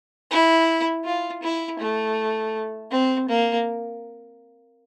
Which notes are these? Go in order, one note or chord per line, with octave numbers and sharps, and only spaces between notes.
E4
F4
E4
A3
C4
A#3